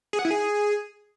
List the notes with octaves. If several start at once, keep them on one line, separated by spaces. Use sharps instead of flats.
G#4
F#5
E4
G#4